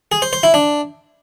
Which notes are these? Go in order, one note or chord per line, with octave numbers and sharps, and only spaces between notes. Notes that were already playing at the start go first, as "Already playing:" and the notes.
G#4
C5
C5
E4
D4